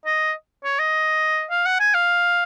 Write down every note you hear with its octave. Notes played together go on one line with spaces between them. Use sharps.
D#5
C#5
D#5
F5
F#5
G#5
F5